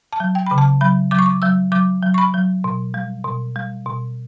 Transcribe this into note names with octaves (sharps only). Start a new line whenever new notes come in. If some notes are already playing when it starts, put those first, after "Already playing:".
A5
F#3
G5
C#3 B5
A5
F#3 B5
F#3 D6
C#6
D6
F#3 E6
F#3 D6
F#3
C#6
B5
F#3
B2
G3
B2
G3
B2